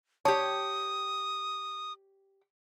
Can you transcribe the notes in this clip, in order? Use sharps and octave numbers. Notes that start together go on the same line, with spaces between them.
G4 C#5 A5 D#6